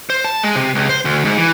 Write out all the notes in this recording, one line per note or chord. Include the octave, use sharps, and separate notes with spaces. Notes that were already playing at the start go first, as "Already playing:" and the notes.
C5
A5
G#3
C3
C#2
C5
D2
G#2
E3